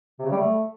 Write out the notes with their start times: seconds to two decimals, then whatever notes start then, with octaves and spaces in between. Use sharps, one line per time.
0.19 C3
0.25 C#3
0.31 G3
0.37 A3